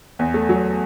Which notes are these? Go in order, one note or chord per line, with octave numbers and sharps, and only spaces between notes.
E2
A3
F#3